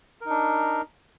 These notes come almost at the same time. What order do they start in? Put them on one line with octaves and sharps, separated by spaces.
A#4 D#4 D4